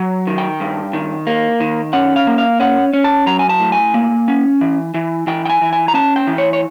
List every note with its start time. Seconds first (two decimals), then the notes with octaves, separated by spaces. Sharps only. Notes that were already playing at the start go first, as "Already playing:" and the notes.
Already playing: F#3
0.27 D#3
0.38 G5
0.60 G2
0.93 D#3
1.27 A#3
1.60 D#3
1.93 C#4 F#5
2.16 F5
2.27 A#3
2.38 F5
2.60 C#4 F#5
2.93 C#4
3.04 A5
3.26 F#3 A#5
3.39 G#5
3.49 A5
3.60 A2
3.72 G#5
3.94 A#3
4.28 C#4
4.61 E3
4.94 E3
5.27 E3 G5
5.46 G5
5.50 G#5
5.62 E3
5.73 G#5
5.88 A#5
5.94 C#4 A5
6.16 G5
6.27 E3
6.38 C#5
6.53 C#5